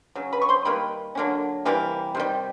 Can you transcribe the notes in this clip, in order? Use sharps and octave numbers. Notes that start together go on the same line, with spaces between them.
C#3 F#3
B4 B5
C#6
C5 C6
D#3 G3 A#3 B4 B5
D3 F#3 A#3 C#4
C3 E3 G3 A#3
C3 D#3 G3